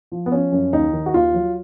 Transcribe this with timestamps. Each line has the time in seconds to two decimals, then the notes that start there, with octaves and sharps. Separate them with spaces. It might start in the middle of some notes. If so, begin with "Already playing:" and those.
0.12 F3
0.26 B3
0.32 F3 C#4
0.52 F#2
0.73 D#2 D#4
0.93 D#3
1.06 F#4
1.14 D#2 F4
1.34 F#3